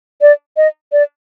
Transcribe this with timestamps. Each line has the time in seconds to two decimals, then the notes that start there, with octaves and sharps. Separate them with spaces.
0.21 D5
0.57 D#5
0.92 D5